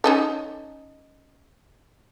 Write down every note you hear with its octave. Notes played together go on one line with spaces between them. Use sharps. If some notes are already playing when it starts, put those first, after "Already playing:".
C#4 D#4 A4